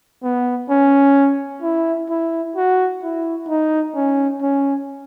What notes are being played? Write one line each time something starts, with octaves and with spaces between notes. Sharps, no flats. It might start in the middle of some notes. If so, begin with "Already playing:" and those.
B3
C#4
E4
E4
F#4
E4
D#4
C#4
C#4